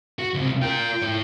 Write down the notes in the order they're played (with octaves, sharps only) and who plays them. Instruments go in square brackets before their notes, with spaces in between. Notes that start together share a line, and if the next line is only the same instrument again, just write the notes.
[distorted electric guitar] F#4
C#2 C3
[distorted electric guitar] F4 A#4 [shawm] G5
[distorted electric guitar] E4 C#5